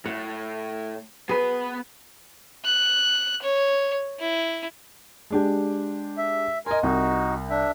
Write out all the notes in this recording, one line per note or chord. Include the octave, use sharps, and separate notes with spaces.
A2 F#5
B3 G#4 B4 B5
F#6
C#5
E4
G#3 D4 G4
E5
A#4 D#5 G#5 C6
C2 D#4 F#4
D4 E5